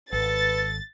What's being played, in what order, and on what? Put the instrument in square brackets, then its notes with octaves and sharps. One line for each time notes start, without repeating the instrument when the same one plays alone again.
[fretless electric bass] G#1 [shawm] A4 [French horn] B4 [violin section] A6